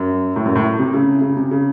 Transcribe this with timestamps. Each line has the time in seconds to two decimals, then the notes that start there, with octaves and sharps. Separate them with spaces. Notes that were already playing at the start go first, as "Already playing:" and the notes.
Already playing: F#2
0.36 A2
0.45 F#2
0.55 A2
0.79 C3
0.94 C#3
1.22 C#3
1.36 C3
1.51 C#3